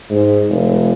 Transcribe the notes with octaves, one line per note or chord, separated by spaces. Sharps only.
G#2
F1